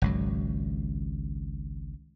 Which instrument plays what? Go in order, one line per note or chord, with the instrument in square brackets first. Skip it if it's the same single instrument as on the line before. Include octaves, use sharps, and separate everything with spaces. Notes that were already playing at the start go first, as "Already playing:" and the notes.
[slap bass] G#1 C#2 F#3